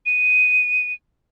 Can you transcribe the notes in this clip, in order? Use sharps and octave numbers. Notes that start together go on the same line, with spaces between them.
D#7